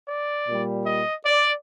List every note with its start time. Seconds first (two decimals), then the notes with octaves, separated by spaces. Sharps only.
0.08 D5
0.47 A#2 G3
0.86 D#5
1.25 D5